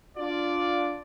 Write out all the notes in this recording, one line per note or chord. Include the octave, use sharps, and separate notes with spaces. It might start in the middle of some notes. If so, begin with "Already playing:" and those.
D4 F4 D5